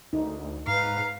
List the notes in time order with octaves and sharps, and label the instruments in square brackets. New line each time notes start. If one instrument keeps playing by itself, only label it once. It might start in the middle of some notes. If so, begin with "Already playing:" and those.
[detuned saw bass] D2 [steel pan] D#4
[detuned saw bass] G#2 [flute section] B4 A#5 [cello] F5